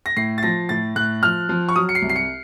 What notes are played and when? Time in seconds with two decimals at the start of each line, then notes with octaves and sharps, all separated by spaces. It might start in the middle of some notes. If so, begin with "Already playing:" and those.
0.06 A#6
0.17 A2 C7
0.38 A6
0.43 F3 A#6
0.69 A2 A6
0.96 A2 F#6
1.23 F3 F6
1.49 F3
1.69 C#6
1.76 F#3 D#6
1.89 C#7
1.95 C7
2.02 C2
2.09 C7
2.16 C#7